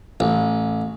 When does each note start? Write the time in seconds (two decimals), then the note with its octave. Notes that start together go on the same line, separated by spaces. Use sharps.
0.20 A1